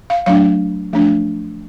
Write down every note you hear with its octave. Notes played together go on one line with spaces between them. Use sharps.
F5
F#3 A3 D4 F5
F3 A3 D4